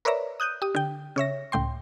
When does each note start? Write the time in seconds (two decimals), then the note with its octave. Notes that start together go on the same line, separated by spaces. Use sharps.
0.05 A#4 B4 C#5 D5 E5 A#5
0.40 D#6 F#6 G6 D#7
0.62 G4 D#6
0.75 D3 G5
1.16 C#3 C#5 E5 A#6
1.52 C#2 A2 G5 C6